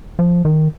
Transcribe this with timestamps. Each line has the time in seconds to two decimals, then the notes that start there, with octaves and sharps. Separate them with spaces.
0.19 F3
0.45 D#3